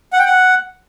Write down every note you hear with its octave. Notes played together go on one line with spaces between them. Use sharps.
F#5
G5
F#5